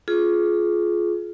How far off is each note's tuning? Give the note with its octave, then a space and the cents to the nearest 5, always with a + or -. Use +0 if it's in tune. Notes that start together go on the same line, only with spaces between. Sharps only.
F4 +0 G#4 +25